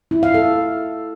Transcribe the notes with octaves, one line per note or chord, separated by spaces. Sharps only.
E4
F5
A4